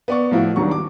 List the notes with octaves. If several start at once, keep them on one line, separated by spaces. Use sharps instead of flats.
B3 D5 C#6
A2 F3 E4 F#4
D#1 D#3 F#3 D4 C#6
D6